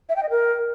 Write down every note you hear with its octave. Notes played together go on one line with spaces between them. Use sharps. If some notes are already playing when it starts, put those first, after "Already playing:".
E5
G5
D#5
A#4